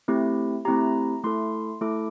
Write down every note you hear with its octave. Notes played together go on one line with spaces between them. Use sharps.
A3 C4 E4 G4
A3 C4 E4 G4 A#5
A3 E4 A4 C6
A3 E4 A4 D6